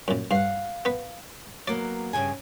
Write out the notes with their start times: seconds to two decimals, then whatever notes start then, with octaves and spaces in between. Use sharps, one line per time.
0.08 F#2 A#2
0.31 G2 F5 F#5
0.85 B3 B4
1.68 F#3 A#3 B3 D5
2.13 G2 C#3 G#5